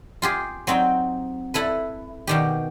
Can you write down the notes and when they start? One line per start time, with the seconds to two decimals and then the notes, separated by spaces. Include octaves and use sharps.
0.22 F4 G4 G#4
0.67 F#3 C4 D#4 G5
1.54 E4 A4 B4
2.27 B2 D#3 G4